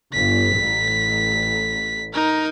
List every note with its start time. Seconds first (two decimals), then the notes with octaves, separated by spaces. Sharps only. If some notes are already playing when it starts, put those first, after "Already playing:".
0.13 G1 G2 B6
0.59 A1
2.14 D#4 A#4